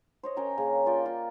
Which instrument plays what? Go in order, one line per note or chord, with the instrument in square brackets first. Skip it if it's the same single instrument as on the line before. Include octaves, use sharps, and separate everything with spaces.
[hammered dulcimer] C5 C#5 D#5
C#4 A#4 G5 A#5
C#3 A#3
F4 D5 G5
F4